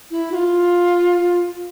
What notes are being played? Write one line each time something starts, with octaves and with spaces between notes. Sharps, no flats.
E4
F#4
F4